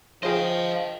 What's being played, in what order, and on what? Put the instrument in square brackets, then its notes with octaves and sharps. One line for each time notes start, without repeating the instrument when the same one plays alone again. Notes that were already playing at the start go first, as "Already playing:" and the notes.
[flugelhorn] F3 [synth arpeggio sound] F4 G#4 [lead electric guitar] C5 F5 [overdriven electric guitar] D#5 G5